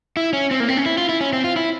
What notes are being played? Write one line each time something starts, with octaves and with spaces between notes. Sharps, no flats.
E4
C#4
C4
A#3
C4
C#4
E4
F4
E4
C#4
C4
F4
E4